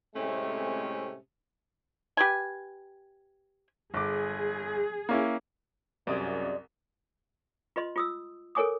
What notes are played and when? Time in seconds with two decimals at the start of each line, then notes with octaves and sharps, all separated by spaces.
0.15 A2 C3 G#3 A3 C4 C#4
2.17 G4 B4 G#5
3.94 G1 G#4 D6
5.09 A#3 C#4 E4
6.07 C2 F#2 C3 G#4 D5 D#5
7.76 F4 B4 D#5 C6
7.96 F4 D#6 E6
8.55 A4 A#4 C#5 G#5 D6 D#6